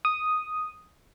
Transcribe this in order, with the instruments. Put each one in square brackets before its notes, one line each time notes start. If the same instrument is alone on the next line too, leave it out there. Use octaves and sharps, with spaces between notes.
[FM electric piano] D#6